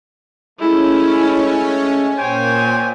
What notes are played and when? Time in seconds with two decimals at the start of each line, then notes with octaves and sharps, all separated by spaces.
0.60 G#3 A3 C#4 E4
2.18 A#2 C5 C#5 G5 G#5